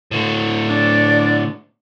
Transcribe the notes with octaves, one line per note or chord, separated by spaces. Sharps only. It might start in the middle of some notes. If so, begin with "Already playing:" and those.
A2 D3
D4 D5